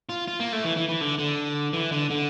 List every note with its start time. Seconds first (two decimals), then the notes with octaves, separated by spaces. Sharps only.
0.09 F4
0.28 F4
0.40 A#3
0.53 A3
0.64 E3
0.77 E3
0.89 E3
1.01 D3
1.19 D3
1.73 E3
1.92 D3
2.10 D3